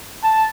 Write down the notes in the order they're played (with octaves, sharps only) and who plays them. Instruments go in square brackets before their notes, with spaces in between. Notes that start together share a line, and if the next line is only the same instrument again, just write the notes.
[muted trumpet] A5